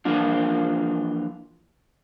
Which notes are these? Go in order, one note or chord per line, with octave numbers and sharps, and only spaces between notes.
E3 F3 A#3 D4 F4